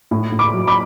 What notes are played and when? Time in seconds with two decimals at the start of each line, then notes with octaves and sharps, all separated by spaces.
0.11 A2
0.32 A2
0.39 B5 D6
0.54 F#3
0.67 B5 D6